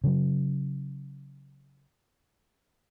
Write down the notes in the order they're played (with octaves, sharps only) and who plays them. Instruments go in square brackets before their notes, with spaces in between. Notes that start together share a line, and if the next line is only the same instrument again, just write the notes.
[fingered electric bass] C#3 F#3